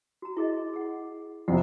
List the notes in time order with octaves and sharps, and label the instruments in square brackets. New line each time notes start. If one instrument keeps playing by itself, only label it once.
[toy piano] F#4 A#5
E4 G#4 D#5
G#4 F#5
[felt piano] F2 C3 [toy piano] F#5